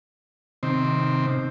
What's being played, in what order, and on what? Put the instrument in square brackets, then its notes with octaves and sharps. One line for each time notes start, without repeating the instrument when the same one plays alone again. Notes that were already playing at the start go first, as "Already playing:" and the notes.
[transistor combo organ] C3 D#3 C4